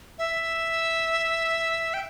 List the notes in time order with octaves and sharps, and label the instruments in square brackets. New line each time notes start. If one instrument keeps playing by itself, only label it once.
[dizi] E5
G5